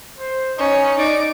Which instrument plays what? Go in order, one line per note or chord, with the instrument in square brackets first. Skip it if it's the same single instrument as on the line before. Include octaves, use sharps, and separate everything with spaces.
[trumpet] C5
[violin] C#4 [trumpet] D#4
[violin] D#4 D7 [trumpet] D5